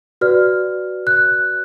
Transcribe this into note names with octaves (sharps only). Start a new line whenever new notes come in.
F#4 B4 D5 F6
F#6